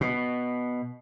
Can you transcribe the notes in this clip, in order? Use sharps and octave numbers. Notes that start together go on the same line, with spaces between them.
B2